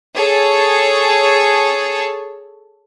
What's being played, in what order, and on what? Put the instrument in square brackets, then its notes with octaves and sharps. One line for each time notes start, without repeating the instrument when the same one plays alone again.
[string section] G#4 A4 C#5 A5